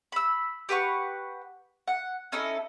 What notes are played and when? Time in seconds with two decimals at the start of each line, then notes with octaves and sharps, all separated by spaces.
0.12 B5 E6
0.69 G4 B4 F#5 C#6
1.88 F#5
2.32 C#4 D#4 E4 A4